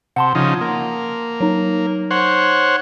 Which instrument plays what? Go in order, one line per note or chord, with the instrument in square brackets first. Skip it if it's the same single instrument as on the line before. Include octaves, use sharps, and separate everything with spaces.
[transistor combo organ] C3 [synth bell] F#5 A5 C6
[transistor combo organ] C#3 F3 D#4
A#3
[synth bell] F#3 D#4
[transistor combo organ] C5 C#5 F#5